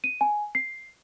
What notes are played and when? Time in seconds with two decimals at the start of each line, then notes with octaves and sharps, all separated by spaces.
0.04 D#7
0.21 G#5
0.55 C7